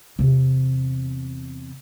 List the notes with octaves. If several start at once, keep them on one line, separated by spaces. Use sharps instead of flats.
E2 C3